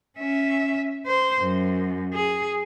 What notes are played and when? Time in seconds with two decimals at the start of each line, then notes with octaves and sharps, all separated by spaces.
0.18 C#4 E5
1.07 C5
1.38 F#2
2.13 G#4